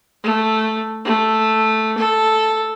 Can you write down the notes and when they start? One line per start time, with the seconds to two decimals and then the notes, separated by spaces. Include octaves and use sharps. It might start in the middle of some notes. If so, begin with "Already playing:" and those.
0.23 A3
1.05 A3
1.97 A4